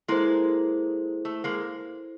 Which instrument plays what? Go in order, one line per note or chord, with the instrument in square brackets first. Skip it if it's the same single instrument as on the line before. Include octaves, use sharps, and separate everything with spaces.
[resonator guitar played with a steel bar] G#3 A#3 [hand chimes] E4 A4 C5
[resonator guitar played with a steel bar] A3
G#3 A#3